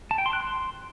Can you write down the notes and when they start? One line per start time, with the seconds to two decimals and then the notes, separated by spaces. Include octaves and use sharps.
0.11 A5
0.18 G5
0.26 C6
0.33 F#6
0.41 C6